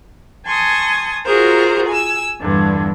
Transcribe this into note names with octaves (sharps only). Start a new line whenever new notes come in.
G#5 A5 C6 C#6 D#6
F4 F#4 G#4 A#4 C5
G#5 E6
E2 G2 D3